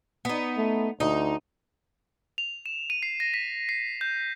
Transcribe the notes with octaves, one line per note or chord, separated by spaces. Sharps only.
B3 D#4
A3
D2 D#4
F7
E7
D#7
C7
A#6
B6
C7
G6